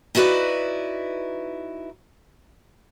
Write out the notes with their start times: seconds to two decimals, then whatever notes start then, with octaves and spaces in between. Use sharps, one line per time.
0.15 D#4 E4 F#4 A#4 B4 D5